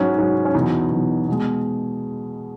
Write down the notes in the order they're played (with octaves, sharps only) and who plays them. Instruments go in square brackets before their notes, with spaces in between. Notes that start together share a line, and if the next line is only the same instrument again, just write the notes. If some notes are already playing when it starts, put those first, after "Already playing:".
Already playing: [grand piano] G#2 F#3 C#4
G#2 F#3
C#4
E2 B2 F#3 D#4
E2 B2 F#3
B2 G#3